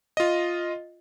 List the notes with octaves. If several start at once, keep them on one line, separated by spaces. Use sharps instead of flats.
F4 D#5